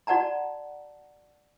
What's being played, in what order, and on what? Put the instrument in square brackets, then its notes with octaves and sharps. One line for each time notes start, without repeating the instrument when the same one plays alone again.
[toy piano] F#4 D5 F#5 A5 A#5